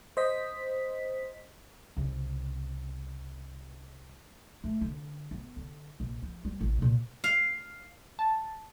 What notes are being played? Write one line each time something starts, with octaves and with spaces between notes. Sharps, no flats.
C5 D#5 B6
C2 C#3
A3
D3
B3
D3
A#1
F3
G3
A1
A#2
F5
A5